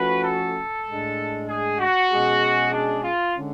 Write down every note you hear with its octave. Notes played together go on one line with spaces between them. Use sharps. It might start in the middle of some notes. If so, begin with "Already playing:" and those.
Already playing: F3 A3 C#4 F#4 B4
A4
A2 G#3 D4
G#4
F#4
B2 G#3 C#4 G#4
D4
F4
D3 G#3 C#4